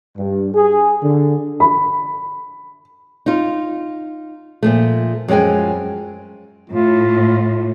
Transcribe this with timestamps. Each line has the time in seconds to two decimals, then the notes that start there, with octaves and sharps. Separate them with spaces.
0.17 G2
0.53 G#4
1.03 D3
1.60 B5
3.26 D#4 F4
4.63 A#2 F3 A3
5.28 F#2 F3 G#3 G5 G#5
6.70 A2 F4